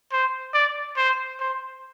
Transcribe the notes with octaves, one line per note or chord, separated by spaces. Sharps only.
C5
D5
C5
C5